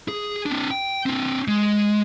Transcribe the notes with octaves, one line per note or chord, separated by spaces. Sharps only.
G#4
C4 D4
G5
C4 D4
G#3